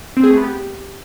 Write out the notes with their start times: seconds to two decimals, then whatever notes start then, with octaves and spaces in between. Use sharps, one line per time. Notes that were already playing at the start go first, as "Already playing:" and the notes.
0.17 C4
0.23 G#4
0.30 A3
0.37 B3
0.44 G4